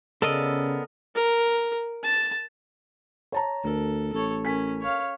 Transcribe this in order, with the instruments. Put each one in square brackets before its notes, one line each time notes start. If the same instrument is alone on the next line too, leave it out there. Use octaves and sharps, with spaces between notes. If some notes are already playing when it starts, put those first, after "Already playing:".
[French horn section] C#3 [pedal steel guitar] B3 D5 E6 [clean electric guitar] A4 A#4 D#5
[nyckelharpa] A#4
A5
[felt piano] C#5 A5 A#5
[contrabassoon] D2 [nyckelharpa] A4 [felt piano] A#4
[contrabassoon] A1 [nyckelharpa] A4 C#5
[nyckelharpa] C#4 [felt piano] A#4 G#5 B6
[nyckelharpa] C#5 F5